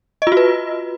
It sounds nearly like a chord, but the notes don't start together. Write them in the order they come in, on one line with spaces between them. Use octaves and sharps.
D#5 F4 F#4 B4